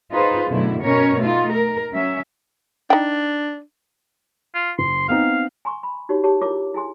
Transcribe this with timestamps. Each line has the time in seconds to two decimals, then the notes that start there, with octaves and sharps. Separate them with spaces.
0.11 D#4 F4 G#4 B4 C5
0.48 F#2 B2 D3 A3 E4
0.82 B2 C#4 A#4 C#5
1.20 A3 D#4 F4
1.53 A#4
1.93 F#3 C#4 E5
2.90 D4 D#4 G5
4.55 F4
4.79 F#1 C6
5.09 B3 C4 D#4 F5
5.65 G#5 A#5 C6 C#6
5.83 B5
6.09 D#4 F#4 G4 C#5
6.24 G4 G#4 C#5 A5
6.41 E4 F4 A#4 C#5 D6
6.74 E4 G#4 G#5 C6